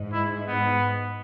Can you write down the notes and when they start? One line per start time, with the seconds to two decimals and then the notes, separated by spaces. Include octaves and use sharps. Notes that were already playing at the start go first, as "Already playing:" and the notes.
Already playing: G#2
0.13 E4
0.48 B3